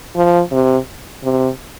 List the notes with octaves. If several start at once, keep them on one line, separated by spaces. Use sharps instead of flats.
F3
C3
C3